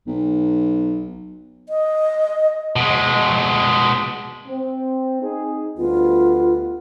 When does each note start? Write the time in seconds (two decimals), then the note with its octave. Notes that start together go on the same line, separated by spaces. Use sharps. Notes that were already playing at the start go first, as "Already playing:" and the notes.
0.07 B1
1.69 D#5
2.76 B2 G#3
4.47 C4
5.21 D#4 G#4
5.78 D2 G3 B3 F4